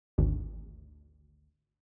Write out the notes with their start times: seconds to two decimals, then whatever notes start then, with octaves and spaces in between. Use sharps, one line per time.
0.18 G#1 D2